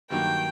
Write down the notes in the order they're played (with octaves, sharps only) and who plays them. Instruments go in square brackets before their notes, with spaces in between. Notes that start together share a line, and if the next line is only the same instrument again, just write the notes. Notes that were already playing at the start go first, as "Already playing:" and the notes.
[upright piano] G2 D#3 F#3 A#3 [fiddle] G5